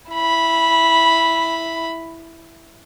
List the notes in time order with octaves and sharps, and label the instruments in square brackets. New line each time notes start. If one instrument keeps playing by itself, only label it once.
[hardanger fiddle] E4 B5